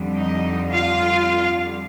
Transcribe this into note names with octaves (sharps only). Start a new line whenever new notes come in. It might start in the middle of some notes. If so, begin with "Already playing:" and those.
Already playing: F2 D3 G3
D#4 D#5
F4 F5